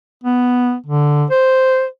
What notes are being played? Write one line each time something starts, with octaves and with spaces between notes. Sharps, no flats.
B3
D3
C5